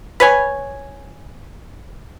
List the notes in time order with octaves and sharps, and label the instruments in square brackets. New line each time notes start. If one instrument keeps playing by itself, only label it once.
[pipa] B4 C#5 G#5